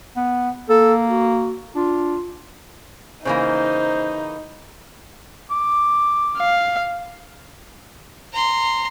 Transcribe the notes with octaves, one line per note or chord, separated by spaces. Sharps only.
B3
A#3 A4
F#4
D4 F4
C#3 E3 A#3 D#4 C5
D6
F5
A#5 C6